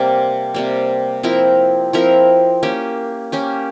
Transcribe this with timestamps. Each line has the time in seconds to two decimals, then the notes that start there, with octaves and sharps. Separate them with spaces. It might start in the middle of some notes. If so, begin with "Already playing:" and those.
Already playing: C3 G3 A#3
0.54 C3 G3 A#3
1.23 F3 C4 E4 A#4
1.93 F3 C4 E4 A#4
2.63 A#3 C#4 G4
3.32 A#3 C#4 G4